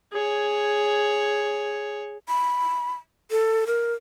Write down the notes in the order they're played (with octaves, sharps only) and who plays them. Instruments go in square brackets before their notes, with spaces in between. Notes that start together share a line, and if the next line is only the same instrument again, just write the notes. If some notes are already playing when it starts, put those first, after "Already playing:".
[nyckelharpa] G#4 C#5
[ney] B5
A4
A#4